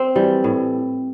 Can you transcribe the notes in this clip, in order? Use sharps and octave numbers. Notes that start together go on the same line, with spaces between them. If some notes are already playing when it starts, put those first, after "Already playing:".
Already playing: C4
E3 G3
A2